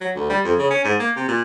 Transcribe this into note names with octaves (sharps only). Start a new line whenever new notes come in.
F#3
D2
G3
F2
C#3
C#4
G#2
A#3
C3
A#2